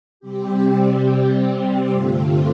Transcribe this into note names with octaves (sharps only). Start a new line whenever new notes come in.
C3 G3 C4 G4
G2 D3 A3 C4 F4